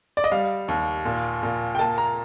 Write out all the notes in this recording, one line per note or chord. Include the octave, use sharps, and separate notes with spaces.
D5
D#5
G3 F5
D#2
A#2
A#2
G5
A#3 A5
A#5